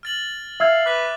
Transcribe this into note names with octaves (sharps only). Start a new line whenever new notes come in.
F6 A6 F#7
E5 F5 E6 G#6
B4 D6 F#6